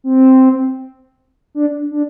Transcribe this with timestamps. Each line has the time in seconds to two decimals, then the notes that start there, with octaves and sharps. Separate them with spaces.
0.04 C4
1.55 D4
1.91 D4